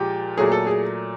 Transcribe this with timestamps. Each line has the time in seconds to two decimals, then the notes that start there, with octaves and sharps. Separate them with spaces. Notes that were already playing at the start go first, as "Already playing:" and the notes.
Already playing: A#2 F3 G#3 G4
0.38 A#2 F#3 A3 G#4
0.52 A4
0.67 G#4